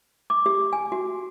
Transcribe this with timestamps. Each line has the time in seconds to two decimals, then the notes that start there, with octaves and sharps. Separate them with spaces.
0.30 D6
0.46 G4
0.73 G#5
0.92 F#4